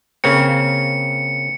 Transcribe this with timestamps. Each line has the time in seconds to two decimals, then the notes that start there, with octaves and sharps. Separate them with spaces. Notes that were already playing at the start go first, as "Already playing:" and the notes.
0.24 C#3 A#3 C4 C#7